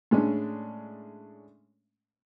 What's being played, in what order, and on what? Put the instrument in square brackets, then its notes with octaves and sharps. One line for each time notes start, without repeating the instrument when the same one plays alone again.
[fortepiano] A2 G#3 C#4 D4